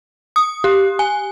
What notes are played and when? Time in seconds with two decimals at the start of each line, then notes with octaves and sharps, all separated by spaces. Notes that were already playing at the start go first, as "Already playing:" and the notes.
0.36 D#6
0.64 G4
0.99 G#5